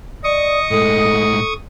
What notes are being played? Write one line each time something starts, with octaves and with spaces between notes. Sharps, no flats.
D5 D#5 C#6 D#6
A2 G#3 A4